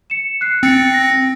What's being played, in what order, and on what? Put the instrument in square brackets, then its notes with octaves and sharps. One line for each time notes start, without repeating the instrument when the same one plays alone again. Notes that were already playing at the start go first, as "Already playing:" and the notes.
[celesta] C#7 E7
F#6 C7
[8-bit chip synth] C4 [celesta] A6 C#7
[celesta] A#6